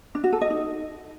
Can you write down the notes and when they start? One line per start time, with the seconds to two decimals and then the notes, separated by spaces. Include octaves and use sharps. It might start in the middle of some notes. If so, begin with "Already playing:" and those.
0.15 D4
0.24 F#4
0.33 A4
0.41 D#5
0.50 D#4